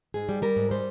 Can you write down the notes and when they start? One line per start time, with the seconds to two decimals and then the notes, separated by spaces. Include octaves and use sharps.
0.14 G#2 G#4
0.29 G3
0.42 G3 A#4
0.56 G#2
0.71 G3 C5